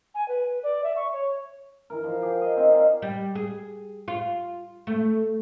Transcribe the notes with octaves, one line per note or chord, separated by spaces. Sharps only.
G#5
B4
D5
E5
C#6
C#5
E3 A#4
F3
G4 G#4
D#5
C4 D#4 F#5 G#5
C5 D5 F5
G3
G#4
F4
A3